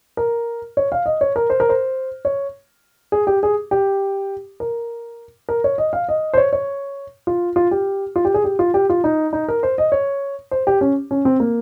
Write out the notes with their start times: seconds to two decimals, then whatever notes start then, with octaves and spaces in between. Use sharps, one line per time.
0.17 A#4
0.77 C#5
0.92 F5
1.06 D#5
1.21 C#5
1.36 A#4
1.50 C5
1.60 A#4
1.69 C5
2.25 C#5
3.12 G#4
3.27 G4
3.43 G#4
3.71 G4
4.60 A#4
5.49 A#4
5.64 C#5
5.78 D#5
5.93 F5
6.09 D#5
6.34 C5
6.37 C#5
6.53 C#5
7.27 F4
7.56 F4
7.71 G4
8.16 F4
8.25 G4
8.34 G#4
8.44 G4
8.59 F4
8.74 G4
8.90 F4
9.04 D#4
9.33 D#4
9.48 A#4
9.63 C5
9.78 D#5
9.92 C#5
10.51 C5
10.67 G4
10.81 C#4
11.11 C#4
11.25 C4
11.40 A#3